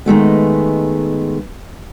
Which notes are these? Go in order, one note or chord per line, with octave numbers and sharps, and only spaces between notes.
D#3 G#3 A3 B3